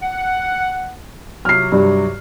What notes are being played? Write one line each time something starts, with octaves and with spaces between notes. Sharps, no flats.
F#5
C3 F#3 F#4 F6 C7
G2